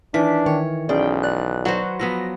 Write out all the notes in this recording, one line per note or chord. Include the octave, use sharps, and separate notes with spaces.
D#3 E3 D4 B6
D#3 C#5
B1 C#4 G#4 D5 G5
D5 F#6
F#3 F#4 B4 C5
F3 F#3 B3 A#6